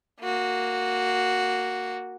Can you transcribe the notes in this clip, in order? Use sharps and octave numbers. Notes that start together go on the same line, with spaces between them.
A#3 F#4